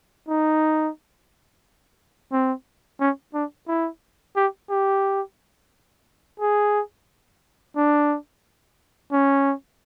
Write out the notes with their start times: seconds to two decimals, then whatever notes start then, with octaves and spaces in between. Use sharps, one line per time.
0.28 D#4
2.32 C4
3.00 C#4
3.34 D4
3.68 E4
4.36 G4
4.70 G4
6.40 G#4
7.76 D4
9.12 C#4